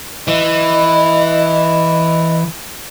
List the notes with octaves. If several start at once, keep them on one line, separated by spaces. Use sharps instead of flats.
E3 D#5